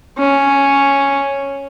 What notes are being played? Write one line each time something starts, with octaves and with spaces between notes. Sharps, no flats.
C#4